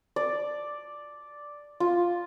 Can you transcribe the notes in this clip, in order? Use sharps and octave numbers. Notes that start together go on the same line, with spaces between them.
D5
F4